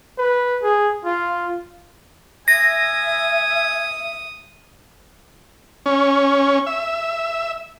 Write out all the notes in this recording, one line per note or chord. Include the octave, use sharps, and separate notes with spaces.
B4
G#4
F4
E5 G#5 D#6 A#6
C#4
E5